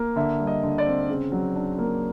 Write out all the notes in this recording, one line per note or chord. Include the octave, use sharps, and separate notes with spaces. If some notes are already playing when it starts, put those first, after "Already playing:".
Already playing: A#3
D3 E5
G3
D#5
D3
D5
C4
C#3
F#3
D4
A#3